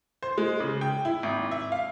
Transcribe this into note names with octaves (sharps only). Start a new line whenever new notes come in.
C5
G#3
C#3
G5
E4
G#1
E5
F5